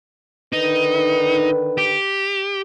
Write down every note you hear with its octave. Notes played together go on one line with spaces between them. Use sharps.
D3 D#3 D#4 B4
G4